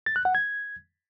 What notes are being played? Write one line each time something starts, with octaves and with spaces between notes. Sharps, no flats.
A6
F#6
F#5
G#6